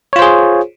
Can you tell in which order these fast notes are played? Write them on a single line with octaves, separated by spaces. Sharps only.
C#5 F4 C5 G#4